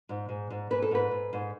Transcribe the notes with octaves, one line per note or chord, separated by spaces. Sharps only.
G#2
G#2
G#2
G#2 B4
A4
G#2 B4
G#2
G#2